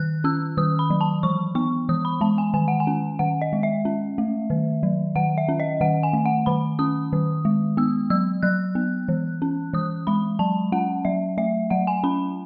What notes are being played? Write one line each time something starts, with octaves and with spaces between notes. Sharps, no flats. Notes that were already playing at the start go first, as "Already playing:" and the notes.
Already playing: D#3 F#6
C#4 E6
D#3 D#6
B5
F#3
A5
E3 C#6
B3 C#6
E3 D#6
B5
G#3 A5
G#5
D#3 G#5
F#5
G#5
C#4
D#3 F#5
D#5
G#3
E5
C#4
A3
D#3
F#3
D#3 F#5
E5
C#4
D#5
D#3 F#5
G#5
A3
F#5
D#3 B5
C#4 D#6
D#3
G#3
B3 E6
F#3 E6
F#3 F#6
B3
E3
C#4
E3 D#6
G#3 B5
F#3 A5
C#4 F#5
F#3 E5
A3 E5
F#3 F#5
G#5
C#4 B5